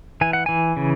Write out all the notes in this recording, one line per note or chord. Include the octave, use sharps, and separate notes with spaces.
E3 G#5
F#5
E3 G#5
C#3